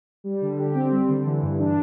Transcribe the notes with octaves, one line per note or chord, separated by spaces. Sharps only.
G3
D3
G4
C4
G3
D3
E3
G2
D4